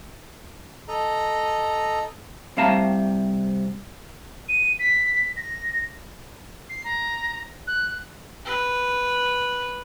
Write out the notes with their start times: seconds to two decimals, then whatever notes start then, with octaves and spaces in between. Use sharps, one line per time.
0.88 A4 D#5 A#5
2.57 C2 C3 A3 F5 A5 A#5
4.49 D#7
4.79 B6
5.37 A#6
6.69 C7
6.84 A#5
7.67 F#6
8.45 B4